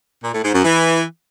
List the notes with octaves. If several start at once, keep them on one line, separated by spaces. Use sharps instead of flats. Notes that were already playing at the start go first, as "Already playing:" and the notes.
A#2
A2
G#2
F#2
E3